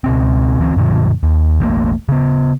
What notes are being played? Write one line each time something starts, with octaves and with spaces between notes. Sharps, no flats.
C#2 B2 C4
D2 E3 C4
F#2 A#2 D3 F3
D#2
E1 A1 A3 A#3
C#3 B3